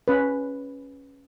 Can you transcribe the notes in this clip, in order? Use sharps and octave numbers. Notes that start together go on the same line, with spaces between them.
C#4 B4